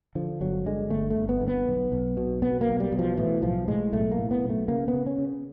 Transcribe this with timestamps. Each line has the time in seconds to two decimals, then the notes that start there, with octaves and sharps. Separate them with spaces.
0.15 D3 F3
0.41 G1 F#3
0.66 D3 G#3
0.90 G1 A3
1.10 A3
1.16 G1
1.29 B3
1.41 G1
1.48 B3
1.67 B1
1.92 B1
2.17 B2
2.42 B2 B3
2.61 A#3
2.67 B1
2.80 G3
2.92 B2
2.99 F3
3.17 A2 E3
3.42 B1 F3
3.68 A2 G#3
3.93 B1 A3
4.12 A#3
4.18 A2
4.31 B3
4.44 B1
4.50 A3
4.68 C#3 A#3
4.88 B3
4.93 C#3
5.06 C#4
5.18 C#3